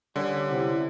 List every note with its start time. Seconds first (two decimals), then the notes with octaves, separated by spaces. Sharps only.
0.16 D3 G3 C#4
0.50 C3 E4